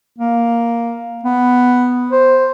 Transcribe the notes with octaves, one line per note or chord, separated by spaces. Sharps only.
A#3
B3
C5